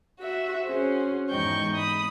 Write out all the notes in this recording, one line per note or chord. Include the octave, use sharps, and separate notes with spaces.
F#4 E5
C#4 F#4 G#4 C5
E2 G#2 D#4 G5 C#6 G6
B5 D#6